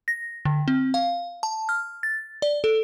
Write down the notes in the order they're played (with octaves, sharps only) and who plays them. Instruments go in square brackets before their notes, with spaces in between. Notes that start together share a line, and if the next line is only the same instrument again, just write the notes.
[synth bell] A#6
D3
C4
F5
A5
F6
A6
D5
A4